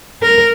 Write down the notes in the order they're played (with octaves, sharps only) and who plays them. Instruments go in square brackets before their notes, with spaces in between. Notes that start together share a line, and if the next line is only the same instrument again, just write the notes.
[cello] A#4